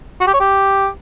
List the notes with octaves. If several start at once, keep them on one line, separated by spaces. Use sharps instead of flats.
F#4
G4
C#5
G4